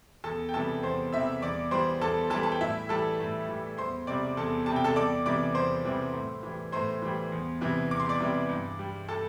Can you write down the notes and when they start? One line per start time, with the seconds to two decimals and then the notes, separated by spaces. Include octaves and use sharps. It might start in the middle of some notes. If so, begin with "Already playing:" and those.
0.24 E2 A4 A5
0.49 G5
0.53 C3 E3 G3 A4 A5
0.83 E2 C5 C6
1.12 C3 E3 G3 E5 E6
1.42 E2 D5 D6
1.71 E3 G3 C5 C6
2.01 E2 A4 A5
2.30 E3 A4 A5
2.35 G3
2.43 A5
2.52 G5
2.60 A2 E4 E5
2.89 E3 G3 A4 A5
3.19 A2
3.49 E3 G3
3.78 E2 C5 C6
4.07 C3 G3 D5 D6
4.37 E2 A4 A5
4.66 C3 G3 A5
4.76 G5
4.84 A4 A5
4.95 E2 D5 D6
5.25 C3 E3 G3 D5 D6
5.55 E2 C5 C6
5.85 C3 E3 G3
6.14 A2
6.43 E3 G3
6.72 A2 C5 C6
7.02 E3 G3
7.32 E2
7.61 C3 E3 G3
7.91 E2 D6
8.00 C6
8.09 D5 D6
8.20 C3 E3 G3
8.49 G2
8.79 G3
9.08 A4 A5